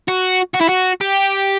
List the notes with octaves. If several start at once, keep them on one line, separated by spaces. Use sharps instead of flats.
F#4
F#4
E4
F#4
G4